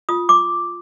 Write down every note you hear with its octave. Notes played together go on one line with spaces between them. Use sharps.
F4 D#6
D6